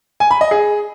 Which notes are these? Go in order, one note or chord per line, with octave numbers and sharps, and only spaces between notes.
G#5
B5
D#5
G#4